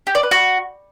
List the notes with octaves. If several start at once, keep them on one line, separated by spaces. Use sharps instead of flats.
G4
D5
B4
F#4